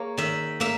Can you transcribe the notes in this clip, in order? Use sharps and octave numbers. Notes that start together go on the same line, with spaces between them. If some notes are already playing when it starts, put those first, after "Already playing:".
Already playing: A#3 G#4 C#5
D#3 E5
A#3 E5